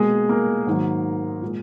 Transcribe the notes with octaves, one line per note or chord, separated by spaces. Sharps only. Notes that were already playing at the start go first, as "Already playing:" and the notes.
Already playing: B2 G#3 A#3 G#4
A#3 A#4
G#2 D#3 F#3
A#2 G#3